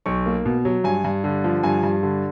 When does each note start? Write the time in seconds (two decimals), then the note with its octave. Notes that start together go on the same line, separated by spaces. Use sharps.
0.06 B1 C#6
0.26 A#3
0.46 B2
0.65 F#3
0.84 G2 G#5
1.04 G2
1.24 D3
1.44 F3
1.63 G2 G#5
1.83 G2
2.03 D3